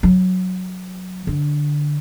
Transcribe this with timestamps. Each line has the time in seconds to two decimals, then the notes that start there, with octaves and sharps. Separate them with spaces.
0.03 F#3
1.27 D3